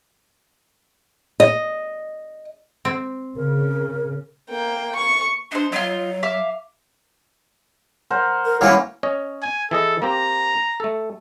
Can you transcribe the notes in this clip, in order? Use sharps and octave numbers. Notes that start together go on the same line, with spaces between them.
D#5
C4
C#3 A#4
A#3 G5
C#6
D4 D#4 C5
F#3 D#4 F4
E5 F5 D6
A#4 C5 F#5
A#4
E3 F#3 G3 A#3 C#4 E4 F5
C#4 C#5 D#5
G#5
E3 G#4 A4 D#5
A#3 C4 G4 A#5
A3 A4